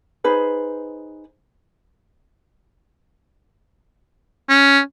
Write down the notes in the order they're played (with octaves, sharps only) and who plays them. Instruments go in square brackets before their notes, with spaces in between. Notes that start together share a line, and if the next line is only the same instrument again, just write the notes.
[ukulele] D#4 G#4 B4 C5
[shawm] C#4